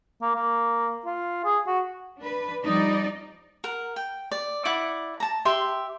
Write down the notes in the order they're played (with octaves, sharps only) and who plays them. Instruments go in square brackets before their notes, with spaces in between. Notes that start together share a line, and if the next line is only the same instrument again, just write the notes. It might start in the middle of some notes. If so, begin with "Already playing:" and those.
[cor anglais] A#3
A#3
F4
G#4
F#4
[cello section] D4 B4
F3 G3 D#4 D5 D#5
[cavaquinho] A#4 F#5
G5
D5
E4 D5 F#5 D6
A5 A#5
G4 E5 C6